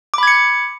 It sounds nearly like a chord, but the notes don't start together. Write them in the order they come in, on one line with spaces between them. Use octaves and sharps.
D6 B5 G#6 C#7